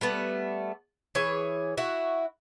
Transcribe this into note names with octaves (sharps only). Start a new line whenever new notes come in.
G3 A3 B3
E3 G#4 C#5
E4 F#4